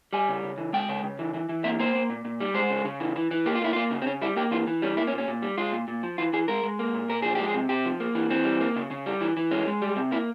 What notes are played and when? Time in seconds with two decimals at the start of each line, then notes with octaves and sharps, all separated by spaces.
0.13 G3 G#5
0.29 C#3
0.43 C#3
0.58 E3
0.73 G#3 G5
0.89 C#3
1.04 C#3
1.19 E3
1.34 E3
1.49 E3
1.64 A#3 E5
1.79 A#3 C5
1.95 A#3
2.10 A#2
2.25 A#2
2.40 G3
2.54 G#3 C5
2.70 C#3
2.85 C#3
3.00 E3
3.16 E3
3.31 E3
3.46 A#3 G4
3.55 F4
3.62 A#3 E4
3.73 A#3 F4
3.91 C#3
4.02 C4
4.06 C#3 C#4
4.22 G3 E4
4.37 A#3 G4
4.51 E3 F4
4.67 E3
4.82 G3 C#4
4.97 A#3 E4
5.07 C#4
5.13 A#2
5.18 C#4
5.28 A#2
5.42 G3
5.58 G#3 F4
5.73 A#2
5.88 A#2
6.03 F3
6.18 E3 F4
6.33 E3 G#4
6.48 G#3 A#4
6.63 G#3
6.79 A#3
6.94 A#2
7.09 A#2 A#4
7.22 F3 G#4
7.35 G#3 G4
7.48 G#4
7.54 C3
7.69 C3 G4
7.85 F3
8.00 A#3
8.15 E3
8.30 E3 C4
8.45 G3
8.61 A#3
8.76 C#3
8.91 C#3
9.06 G3
9.21 E3
9.37 E3
9.51 G#3 C#4
9.67 G#3
9.82 G3
9.96 C3
10.12 A#3 E4